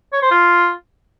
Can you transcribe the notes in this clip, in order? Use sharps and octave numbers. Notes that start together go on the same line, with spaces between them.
C#5
C5
F4